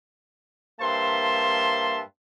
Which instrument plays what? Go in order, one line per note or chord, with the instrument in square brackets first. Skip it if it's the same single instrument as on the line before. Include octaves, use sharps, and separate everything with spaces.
[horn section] G2 A#3 C5 E5 A5 C6